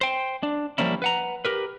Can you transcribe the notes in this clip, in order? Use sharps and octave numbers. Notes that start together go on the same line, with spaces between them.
C5 G5
D4
F3 G3 A#3 C#4 E4
B4 F#5 A#5
G4 A#4 B4